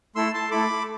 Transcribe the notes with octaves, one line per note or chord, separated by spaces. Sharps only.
A3 E4 A4 C6 E6
A5 C6
A3 E4 A4 B5 D6